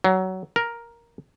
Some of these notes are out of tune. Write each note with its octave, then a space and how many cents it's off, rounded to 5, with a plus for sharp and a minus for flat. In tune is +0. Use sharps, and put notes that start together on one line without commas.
F#3 +20
A#4 +5